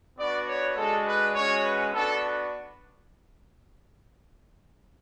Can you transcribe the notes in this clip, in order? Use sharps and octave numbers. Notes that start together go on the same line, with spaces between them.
B3 D4 F#4 D5
C#5
G#3 D4 F#4 A4
B4
G#3 C#4 F#4 C#5
B4
B3 D4 F#4 A4